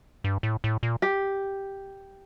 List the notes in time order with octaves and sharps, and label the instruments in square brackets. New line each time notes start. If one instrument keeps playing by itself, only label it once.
[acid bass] G2
A2
A2
A#2
[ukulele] G4